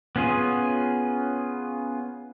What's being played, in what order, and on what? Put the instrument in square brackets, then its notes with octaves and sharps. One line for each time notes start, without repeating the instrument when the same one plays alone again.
[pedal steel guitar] B3 C#4 F4 G#4